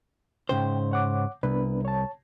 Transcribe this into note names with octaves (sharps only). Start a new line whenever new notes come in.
G#2 C#3 C5 G5
C#5 F#5 D6
C2 B3 D4 B4
C#5 A5